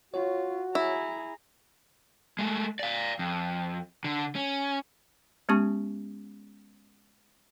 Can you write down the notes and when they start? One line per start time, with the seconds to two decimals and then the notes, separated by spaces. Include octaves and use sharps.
0.14 F4 F#4 C#5
0.75 E4 G#4 A#5
2.39 G#3 A3
2.79 D5 F5
3.19 F2
4.04 D3
4.35 C#4
5.49 G#3 B3 C#4 G4 A5 C#6